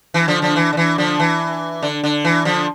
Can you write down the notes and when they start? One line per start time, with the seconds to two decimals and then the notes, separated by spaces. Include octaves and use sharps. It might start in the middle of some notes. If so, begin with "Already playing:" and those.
0.14 E3
0.28 D3 F3
0.42 D3 F3
0.56 E3
0.73 D3
0.77 E3
0.98 D3 F3
1.20 E3
1.83 D3
2.04 D3
2.25 E3
2.45 D3 F3